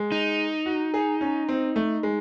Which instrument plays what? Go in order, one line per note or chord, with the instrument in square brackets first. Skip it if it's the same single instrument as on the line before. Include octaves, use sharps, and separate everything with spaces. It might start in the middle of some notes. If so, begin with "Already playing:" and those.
Already playing: [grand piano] G#3
[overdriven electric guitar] D#4
[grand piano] F#4
G#4
C#4
C4
A3
G#3